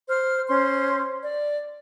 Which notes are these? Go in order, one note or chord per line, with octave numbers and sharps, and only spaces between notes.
C5 F6
C#4 C5 C6
D5